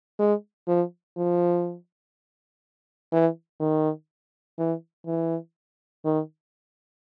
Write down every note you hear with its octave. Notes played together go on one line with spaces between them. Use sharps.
G#3
F3
F3
E3
D#3
E3
E3
D#3